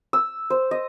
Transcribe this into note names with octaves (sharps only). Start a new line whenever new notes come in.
E6
C5
D#5